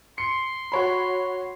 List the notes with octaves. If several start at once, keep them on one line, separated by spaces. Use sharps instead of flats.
C6 C#7
F#4 C#5 B5